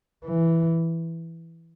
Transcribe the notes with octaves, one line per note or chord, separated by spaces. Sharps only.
E3